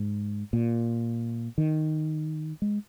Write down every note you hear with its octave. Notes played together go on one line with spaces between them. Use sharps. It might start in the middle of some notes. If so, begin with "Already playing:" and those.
Already playing: G#2
A#2
D#3
G#3